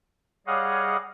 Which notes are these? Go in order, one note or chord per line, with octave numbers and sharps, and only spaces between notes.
G3 G#4 C#5 D#5 F5 F#5